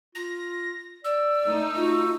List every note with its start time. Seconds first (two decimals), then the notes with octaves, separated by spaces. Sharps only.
0.15 F4 A#6
1.04 D5 E6
1.44 A3 D#4
1.76 F4 F#4